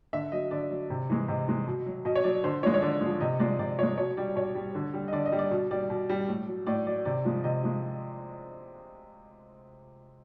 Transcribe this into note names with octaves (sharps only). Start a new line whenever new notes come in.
D3 E5
F#3 D#5
D3 D5
F#3
C3
E3 G#3
C3 D#5
E3 G#3
B2
F#3
B2 D#5
C#5
F#3 D5
D3 C5
F3 G#3 C#5
C#5
D3 D5
F3 G#3
C3 D#5
F3 G#3 D5
C3 D5
F3 G#3 C#5
B2 C#5
G3 D5
B2 C#5
G3
D3
G3
D#5
D3 D5
D#5
G3
D5
B2
G3 D5
B2
G3
A2
F#3
A2 D5
F#3 D5
C3 D5
F3 G#3
C3 D#5
F3 G#3